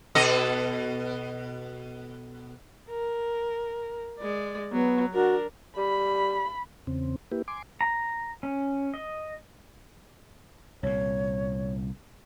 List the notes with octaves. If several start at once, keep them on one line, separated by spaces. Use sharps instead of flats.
B2 A4 D#5
A#4
G#3 D5
F#3 B3
D4 F#4 A#4
G3 B5
E2 C#3 C4
A#3 E4 G4 B4
G#5 C6 D6
A#5
C#4
D#5
C2 A#2 C#5